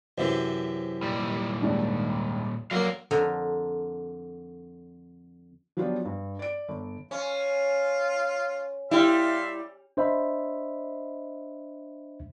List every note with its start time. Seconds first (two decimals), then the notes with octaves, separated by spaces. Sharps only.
0.18 F#2 C3 E3 C5
1.03 A#2 G3
1.62 D#2 G#2 D4
2.71 D3 F#3 A#3 A#4 F5
3.11 F2 D3 A#4
5.77 F3 F#3 B3 D4 F4 G4
6.05 G2
6.39 D5 D7
6.69 G1
7.11 C#4 F4
8.91 G3 E4 G4 E5 F5 C6
9.97 D4 C5 D#5 E5 B5